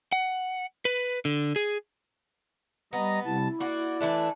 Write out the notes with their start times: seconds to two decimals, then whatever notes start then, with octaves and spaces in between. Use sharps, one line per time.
0.12 F#5
0.85 B4
1.25 D3
1.56 G#4
2.93 G3 B3 D#5 A#5
3.25 C3 G3 E4 A5
3.60 A#3 F#4 D5
4.00 E3 A3 D4